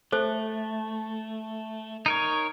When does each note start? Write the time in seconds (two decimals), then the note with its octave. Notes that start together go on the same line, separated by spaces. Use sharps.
0.12 A3 A4 C5
2.06 D#4 A#4 C#5